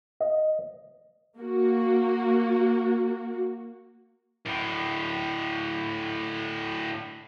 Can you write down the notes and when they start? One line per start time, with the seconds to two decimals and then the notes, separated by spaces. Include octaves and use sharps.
0.20 D#5
1.38 A#3 F#4
4.46 D2 A2